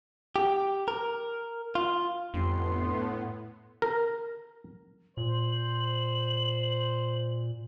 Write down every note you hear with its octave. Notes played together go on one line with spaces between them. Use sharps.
G4
A#4
F4
G1 F2 A2 B3 C6
A#4
A#2 C5 F#7